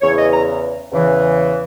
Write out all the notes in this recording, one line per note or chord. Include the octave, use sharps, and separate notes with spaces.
E2 C#3 E3 C#5
D#5
A#5
E2 C#3 E3